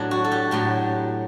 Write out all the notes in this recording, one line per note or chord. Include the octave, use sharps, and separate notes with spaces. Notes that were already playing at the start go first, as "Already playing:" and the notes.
Already playing: A2 F#3 D4
F#4
A4
G4
A2 F#3 G4